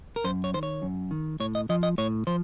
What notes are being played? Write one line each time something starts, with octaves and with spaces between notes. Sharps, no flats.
A#4
F#2 C5
C#5
D#3 C5
C#5
F#2
D#3
A2 C#5
D#5
F3 D#5
D#5
A2 C#5
F3 C5